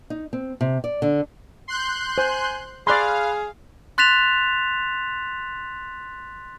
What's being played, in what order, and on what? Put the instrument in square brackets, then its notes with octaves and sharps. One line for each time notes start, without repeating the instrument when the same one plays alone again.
[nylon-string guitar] D#4
C4
C3
D5
D3
[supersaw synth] C6 F#6 G6
[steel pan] C5 [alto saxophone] G#5
[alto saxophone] G#4 [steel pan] D5 C6 [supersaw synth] F5 [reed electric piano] B5 F#6
[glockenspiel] C6 F#6 A6 B6 E7 F7